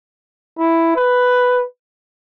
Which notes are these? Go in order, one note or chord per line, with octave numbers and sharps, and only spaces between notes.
E4
B4